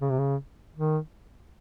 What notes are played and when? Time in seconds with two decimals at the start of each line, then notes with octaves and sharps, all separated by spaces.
0.01 C#3
0.10 C3
0.19 C#3
0.76 D#3